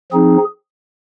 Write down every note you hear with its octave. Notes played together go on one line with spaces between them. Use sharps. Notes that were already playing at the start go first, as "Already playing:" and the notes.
F3 C4 D#4 G#4